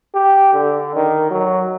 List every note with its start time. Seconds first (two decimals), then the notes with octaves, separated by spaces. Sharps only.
0.15 G4
0.53 D3
0.96 D#3
1.31 F#3